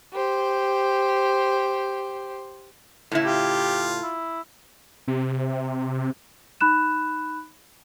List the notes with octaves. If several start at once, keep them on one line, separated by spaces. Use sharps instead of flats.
G4 C5
A2 C#3 E4
F4 G4
E4
C3
D#4 B5 F#6 E7